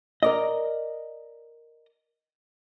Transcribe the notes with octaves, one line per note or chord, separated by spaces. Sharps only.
A#4 D5 D#5